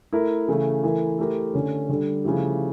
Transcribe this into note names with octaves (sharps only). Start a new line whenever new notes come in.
A3 E4 A#4
C#3 E3 A3
E3 A3 E4 A#4
A3 E4 G4 A#4
D3 A3 C#4
D3 G3 D4 A4
C#3 F3 A3 E4 G4